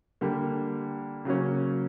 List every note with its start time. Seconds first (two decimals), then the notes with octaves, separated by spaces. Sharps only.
0.21 D3 G3 A#3
1.25 C#3 F#3 A#3 C#4